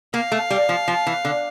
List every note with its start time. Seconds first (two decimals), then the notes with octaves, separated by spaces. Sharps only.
0.13 A#3 F5
0.32 A3
0.50 G3
0.69 F3
0.88 F3
1.07 E3
1.25 D3